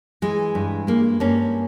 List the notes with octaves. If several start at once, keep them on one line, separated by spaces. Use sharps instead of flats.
E3 G#3
G2
G#3 A#3
G2 A#3 C#4